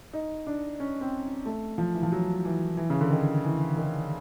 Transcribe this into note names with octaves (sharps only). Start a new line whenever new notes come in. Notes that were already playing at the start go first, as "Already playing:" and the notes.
D#4
D4
C#4
C4
A3
F3
E3
F3
F#3
E3
E3
C#3
D3
D#3
E3
D#3